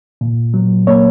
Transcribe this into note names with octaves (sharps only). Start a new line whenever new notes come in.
A#2
F#3
A#3 C#5